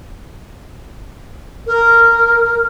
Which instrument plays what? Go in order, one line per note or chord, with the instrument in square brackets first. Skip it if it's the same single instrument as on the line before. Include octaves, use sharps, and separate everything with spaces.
[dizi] A#4